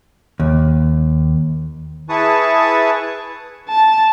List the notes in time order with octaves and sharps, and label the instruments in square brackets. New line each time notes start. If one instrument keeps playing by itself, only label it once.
[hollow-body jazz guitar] D#2
[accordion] E4 G#4 B4 A5 C#6 D#6
[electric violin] A5